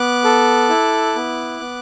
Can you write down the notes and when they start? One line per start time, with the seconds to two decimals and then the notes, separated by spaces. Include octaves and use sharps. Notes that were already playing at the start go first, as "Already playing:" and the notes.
Already playing: B3 D6 F#6
0.24 A4
0.69 E4
1.16 B3
1.61 B3